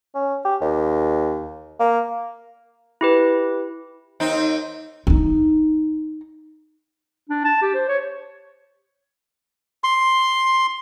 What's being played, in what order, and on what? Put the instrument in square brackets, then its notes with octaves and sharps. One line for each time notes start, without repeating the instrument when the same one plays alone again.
[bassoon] C#4
G4
D#2
A#3
[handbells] E4 G4 B4
[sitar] D#2 C4 D#4
[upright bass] D#4 E4
[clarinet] D4
A5
G4
C5
C#5
[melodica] C6